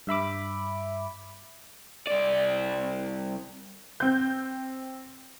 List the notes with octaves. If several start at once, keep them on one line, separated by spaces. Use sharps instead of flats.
G2 E5 B5 D6
C2 D5
C4 G6